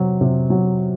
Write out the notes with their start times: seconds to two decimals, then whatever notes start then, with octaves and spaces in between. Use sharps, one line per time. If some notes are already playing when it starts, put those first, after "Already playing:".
Already playing: C3 F#3
0.21 C3
0.50 F#3